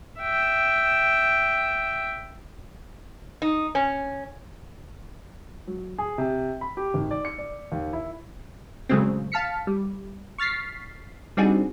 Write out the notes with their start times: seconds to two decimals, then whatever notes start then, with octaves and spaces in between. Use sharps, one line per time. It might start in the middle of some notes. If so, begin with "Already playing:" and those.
0.19 E5 G5
3.42 D#4
3.75 C#4
5.67 F#3
5.99 G#4
6.18 C3
6.61 B5
6.77 G4
6.94 G#1
7.11 D5
7.25 C#7
7.38 D5
7.72 D#2
7.93 E4
8.89 A#2 C#3 F#3 G#3 A3 C4
9.32 F5 A5 F6 B6 C#7
9.67 G3
10.38 C#6 F6 A6 B6 C7
11.37 G3 C4 D4 D#4 F#4 G#4